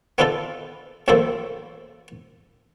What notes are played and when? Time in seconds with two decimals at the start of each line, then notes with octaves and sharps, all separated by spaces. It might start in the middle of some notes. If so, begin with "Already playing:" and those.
0.18 B3 C4 D4 D#4 F4 A4
1.08 A1 F#2 A3 A#3 A4 C5